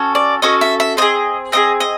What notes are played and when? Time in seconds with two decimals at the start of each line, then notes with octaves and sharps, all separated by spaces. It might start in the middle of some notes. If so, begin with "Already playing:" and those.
Already playing: C#4 F#4 A4
0.15 D5
0.42 C#4 F#4 A4 D#5
0.61 E5
0.80 E5
0.97 C4 D#4 D#5
1.02 G#4
1.52 C4 D#4 G#4 D#5
1.80 D#5